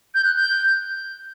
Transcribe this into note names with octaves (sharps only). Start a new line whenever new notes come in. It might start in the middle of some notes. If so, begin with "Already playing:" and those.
G6
F#6
G6